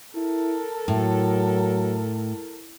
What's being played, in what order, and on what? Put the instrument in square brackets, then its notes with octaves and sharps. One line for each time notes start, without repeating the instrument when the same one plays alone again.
[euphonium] E4 [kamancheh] A4 A#4
[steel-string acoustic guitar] A2 [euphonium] F#3